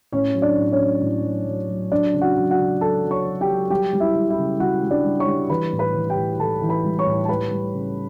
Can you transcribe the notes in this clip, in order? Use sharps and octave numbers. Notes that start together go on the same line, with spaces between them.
A2 C#4 C#5
F#3
D4 D5
A2
C#4 C#5
F#3
A2
F#3
F#3
F#3
F#3 D4 D5
C#3
F#4 F#5
F#3
F#4 F#5
C#3
F#3 A4 A5
F#3
C#5 C#6
F#3
G4 G5
F#3
G3 G4 G5
G3
E4 E5
G3
E4 E5
C#3
G3 F#4 F#5
G3
D4 D5
G3
C#5 C#6
G3
E3 B4 B5
A2
B4 B5
E3
G4 G5
A2
E3 A4 A5
E3
B4 B5
G3
C#5 C#6
A2
A5
G3 B4 B5
G3
C#3